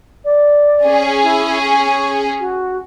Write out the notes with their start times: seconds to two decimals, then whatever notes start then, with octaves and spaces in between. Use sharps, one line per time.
0.25 D5
0.85 C#4 G#4
1.23 E4
1.65 C#6
2.40 F#4